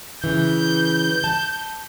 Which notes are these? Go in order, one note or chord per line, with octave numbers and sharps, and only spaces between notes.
C#3 E3 G6
A5